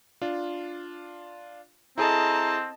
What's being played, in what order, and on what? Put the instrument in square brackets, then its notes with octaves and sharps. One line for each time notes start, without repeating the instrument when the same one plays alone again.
[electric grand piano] D4 F4
[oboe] C4 [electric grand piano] E4 G#4 A4 [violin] D#5 A5 [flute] A#5